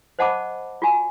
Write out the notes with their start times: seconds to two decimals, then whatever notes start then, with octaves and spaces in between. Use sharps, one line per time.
0.19 C5 D#5 F#5 A5 B5 D6
0.82 F4 F#4 G#5